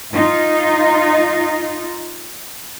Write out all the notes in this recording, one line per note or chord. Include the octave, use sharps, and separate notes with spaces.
D#4 F4